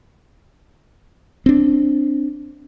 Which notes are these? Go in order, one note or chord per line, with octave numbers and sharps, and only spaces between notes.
C4 D4